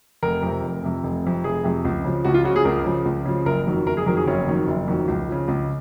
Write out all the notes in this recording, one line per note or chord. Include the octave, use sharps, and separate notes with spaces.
F1 A#4
F2 C3
F1
F2 C3
F1
F2 C3
F1 G#4
F2 C3
C#2
C#3 F3
C#2 F#4
F4
C#3 F3 F#4
G#4
C#2 A#4
C#3 F3
C#2
C#3 F3
F#1 A#4
F2 D#3 F#3
F#1 A#4
G#4
F2 D#3 F#3 A#4
G#4
F#1 C#4
F2 D#3 F#3
F#1
F2 D#3 F#3
C#2
C#3 F3
C#2